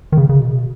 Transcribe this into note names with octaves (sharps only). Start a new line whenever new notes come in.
D#3
C#3
C#3
B2